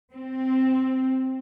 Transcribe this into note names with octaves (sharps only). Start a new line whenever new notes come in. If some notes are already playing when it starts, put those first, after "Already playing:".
C4